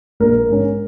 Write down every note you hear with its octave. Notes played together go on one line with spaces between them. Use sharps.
A#1 A#4
G#2 G#3 C#4